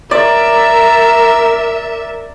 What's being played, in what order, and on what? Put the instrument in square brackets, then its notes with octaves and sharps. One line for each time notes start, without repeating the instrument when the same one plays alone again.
[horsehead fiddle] A#4 [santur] D5 [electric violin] E5 [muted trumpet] A#5